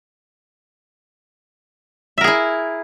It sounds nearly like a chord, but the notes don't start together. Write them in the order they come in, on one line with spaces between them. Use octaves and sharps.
E5 A#4 G#4 E4